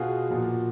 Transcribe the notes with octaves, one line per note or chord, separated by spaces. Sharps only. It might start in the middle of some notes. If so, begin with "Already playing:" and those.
Already playing: B2 F4 F#4 G#4
A#2 F3 F#4